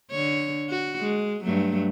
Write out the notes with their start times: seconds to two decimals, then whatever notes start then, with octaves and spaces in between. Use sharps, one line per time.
0.11 D3 C#5
0.70 F#4
1.01 G#3
1.44 G2 F#3 A3